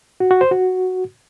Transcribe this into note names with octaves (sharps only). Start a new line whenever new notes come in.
F#4
F#4
C5
F#4